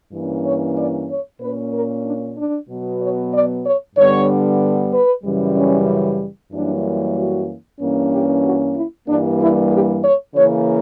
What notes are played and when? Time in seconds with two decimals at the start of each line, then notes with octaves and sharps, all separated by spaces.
0.13 G2 E3 A#3 C#4
0.45 C#5
0.76 D5
1.09 C#5
1.40 A#2 A#3 C#4 B4
1.72 A#4
2.05 D4
2.36 D4
2.69 B2 F#3 B3
3.00 C#5
3.33 D5
3.64 C#5
3.96 G2 D3 G3 B3 C#5
4.92 B4
5.23 F#2 C#3 E3 G3
5.56 C#4
6.52 F#2 E3 G3 A#3 C#4 D4
7.15 F#4
7.79 G2 E3 A#3 C#4
8.11 G4
8.44 F#4
8.75 E4
9.07 G2 E3 G3 A#3 D4
9.39 E4
9.71 G4
10.03 C#5
10.35 C#3 E3 A#3 C#4 C#5